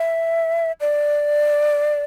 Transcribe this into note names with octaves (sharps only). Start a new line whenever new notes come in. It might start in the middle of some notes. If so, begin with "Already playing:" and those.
Already playing: E5
D5